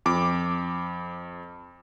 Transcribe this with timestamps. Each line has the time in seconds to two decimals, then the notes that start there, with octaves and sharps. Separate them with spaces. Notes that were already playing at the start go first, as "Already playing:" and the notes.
0.06 F2 D6